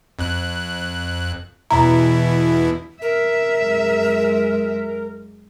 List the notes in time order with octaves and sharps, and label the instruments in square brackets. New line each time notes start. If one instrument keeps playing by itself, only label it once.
[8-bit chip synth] F2 F#6
[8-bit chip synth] E2 B2 E4 [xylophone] A#5
[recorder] A#4 [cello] E5
[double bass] F#2 G#3